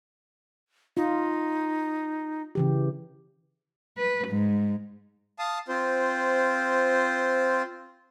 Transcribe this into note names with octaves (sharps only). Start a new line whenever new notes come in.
D#4 F4
C#3 E3 G4
B4
G#2
F5 A5 D#6
C4 F4 C5